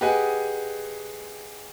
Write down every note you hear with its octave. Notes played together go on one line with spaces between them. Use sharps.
G4 G#4 B4 D#5 F#5 G#5